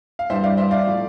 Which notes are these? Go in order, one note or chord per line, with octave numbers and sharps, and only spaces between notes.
F5
G2 E3 G3 C5 E5
D5 F5
C5 E5
D5 F5
A2 F3 A3